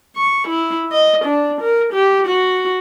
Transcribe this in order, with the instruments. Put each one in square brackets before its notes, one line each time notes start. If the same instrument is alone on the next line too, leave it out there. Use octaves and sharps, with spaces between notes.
[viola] C#6
E4
D#5
D4
A#4
G4
F#4